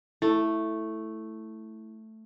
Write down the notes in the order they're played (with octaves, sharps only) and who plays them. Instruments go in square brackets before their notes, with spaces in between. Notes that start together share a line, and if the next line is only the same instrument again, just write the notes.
[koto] A3 [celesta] E4